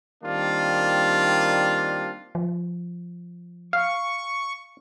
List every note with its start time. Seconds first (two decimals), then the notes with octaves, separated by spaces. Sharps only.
0.24 D#3 G3 A#3 C4 D4 F4
2.35 F3
3.73 F5 C#6